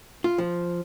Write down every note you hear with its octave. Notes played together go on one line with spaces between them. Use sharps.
F4
F3